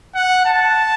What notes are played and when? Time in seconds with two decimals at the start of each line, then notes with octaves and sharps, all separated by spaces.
0.14 F#5
0.45 A5